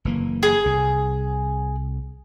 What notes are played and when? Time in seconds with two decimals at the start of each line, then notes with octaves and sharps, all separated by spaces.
0.05 F#1 E3 A#3
0.43 G#4
0.65 C2